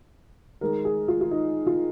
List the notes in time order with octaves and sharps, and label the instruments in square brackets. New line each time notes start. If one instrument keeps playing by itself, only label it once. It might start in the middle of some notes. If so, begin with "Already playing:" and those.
[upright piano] D#3 G#3 A#4
G#4
F4
F4
D#4
F4